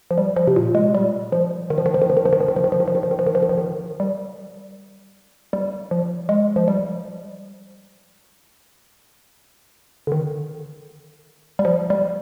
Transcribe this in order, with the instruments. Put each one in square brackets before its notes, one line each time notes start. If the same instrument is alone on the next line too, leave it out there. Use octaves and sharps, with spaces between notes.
[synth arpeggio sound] F3
G3
F3
C3
A#2
G#3
G3
F3
D#3
F3
D#3
F3
D#3
F3
D#3
F3
D#3
F3
D#3
F3
D#3
F3
D#3
F3
D#3
F3
D#3
F3
D#3
F3
D#3
F3
D#3
G3
G3
F3
G#3
F3
G3
D3
D#3
G3
F3
G3